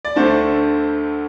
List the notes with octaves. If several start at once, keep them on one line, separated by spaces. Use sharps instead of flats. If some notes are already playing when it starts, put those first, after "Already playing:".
D5
D2 D3 A3 D4 C5